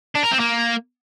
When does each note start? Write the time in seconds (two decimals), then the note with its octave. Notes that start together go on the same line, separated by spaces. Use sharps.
0.16 D4
0.24 A#4
0.32 C4
0.40 A#3